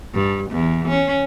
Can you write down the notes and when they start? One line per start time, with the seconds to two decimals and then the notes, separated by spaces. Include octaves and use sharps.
0.14 G2
0.51 E2
0.89 C#4